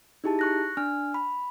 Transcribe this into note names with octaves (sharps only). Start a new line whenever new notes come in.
D#4 E4 G4 G#4 A5
C#6 F#6 A#6
D4 G#5 F6
B5